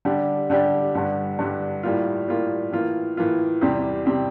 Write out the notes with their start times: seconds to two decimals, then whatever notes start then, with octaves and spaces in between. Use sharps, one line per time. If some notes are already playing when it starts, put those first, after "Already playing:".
0.05 D3 G3 D4 G4
0.50 D3 G3 D4 G4
0.95 G2 D3 G3
1.39 G2 D3 G3
1.83 A2 G3 A#3 F4
2.28 A2 G3 A#3 F4
2.72 A2 E3 A#3 F4
3.17 A2 E3 A#3 F4
3.61 E2 C3 G3 C4 G4
4.06 C3 G3 C4 G4